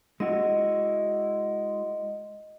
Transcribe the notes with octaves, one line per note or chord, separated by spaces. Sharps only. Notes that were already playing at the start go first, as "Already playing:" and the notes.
G#3 E4 F#4 D#5